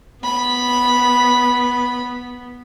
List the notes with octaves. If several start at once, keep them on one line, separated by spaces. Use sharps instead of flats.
B3 B5